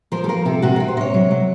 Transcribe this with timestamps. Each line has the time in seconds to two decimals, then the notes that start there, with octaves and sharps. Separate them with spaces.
0.12 F3 A#4
0.24 A4
0.29 F3 A#4
0.45 C3 A4
0.62 C3 F#4
0.76 C3 A#4
0.88 C5
0.97 C3 D#5
1.01 C#5
1.14 F#3
1.31 F#3